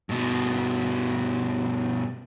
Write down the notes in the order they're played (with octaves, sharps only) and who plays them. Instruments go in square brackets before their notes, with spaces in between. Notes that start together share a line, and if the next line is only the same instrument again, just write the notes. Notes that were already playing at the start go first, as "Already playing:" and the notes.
[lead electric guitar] G2 B2